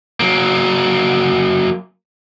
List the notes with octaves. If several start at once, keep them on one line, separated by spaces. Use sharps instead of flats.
F#3 A#3